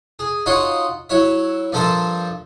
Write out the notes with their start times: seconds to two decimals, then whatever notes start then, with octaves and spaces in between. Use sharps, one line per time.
0.19 G#4
0.46 D#4 F4 F#4 C#5 D#5 C6
1.10 F#3 E4 C#5 E5
1.72 G2 F3 A4 A#4 C5 E5